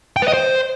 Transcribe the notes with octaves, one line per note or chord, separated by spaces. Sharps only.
G5
B4
D#5
C5